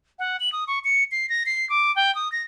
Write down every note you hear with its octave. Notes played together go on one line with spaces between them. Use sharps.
F#5
F#7
D#6
C#6
C#7
C7
A#6
C7
D6
G5
D#6
A#6